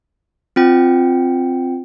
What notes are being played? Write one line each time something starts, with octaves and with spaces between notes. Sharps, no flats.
C4 F4 G5